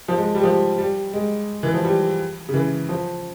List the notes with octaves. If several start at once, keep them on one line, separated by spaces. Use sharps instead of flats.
F3
G#3
G3
F3
G3
G#3
E3
F3
G3
C#3
E3
F3